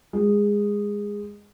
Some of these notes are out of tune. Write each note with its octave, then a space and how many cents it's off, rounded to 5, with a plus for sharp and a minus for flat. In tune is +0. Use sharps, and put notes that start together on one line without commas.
G#3 -15